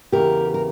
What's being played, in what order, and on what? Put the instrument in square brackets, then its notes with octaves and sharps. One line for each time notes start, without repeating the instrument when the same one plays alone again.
[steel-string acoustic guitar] E2 C#3 E3 G4 A#4
A#4